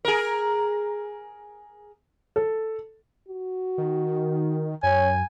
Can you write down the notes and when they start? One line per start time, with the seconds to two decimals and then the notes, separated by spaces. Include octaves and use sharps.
0.05 G#4 A#4
2.36 A4
3.28 F#4
3.78 D#3
4.83 F#2 C#5 G#5